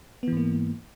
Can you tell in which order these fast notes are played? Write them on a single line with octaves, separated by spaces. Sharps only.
B3 E3 G#2 A#3